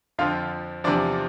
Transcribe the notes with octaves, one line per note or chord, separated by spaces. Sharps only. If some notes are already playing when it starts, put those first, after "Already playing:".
F2 D3 F3 F4 F5
E2 C3 F3 D4 D5